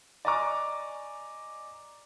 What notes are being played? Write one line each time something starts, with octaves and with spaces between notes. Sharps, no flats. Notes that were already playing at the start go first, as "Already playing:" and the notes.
D5 D#5 G#5 A#5 C#6 D6